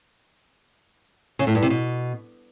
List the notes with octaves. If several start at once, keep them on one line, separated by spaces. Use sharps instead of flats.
C#3
A2
G2
C3
B2